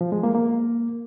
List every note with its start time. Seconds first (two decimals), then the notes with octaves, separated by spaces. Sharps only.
0.01 F3
0.12 G#3
0.23 A#3
0.35 A#3